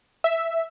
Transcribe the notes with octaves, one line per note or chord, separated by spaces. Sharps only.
E5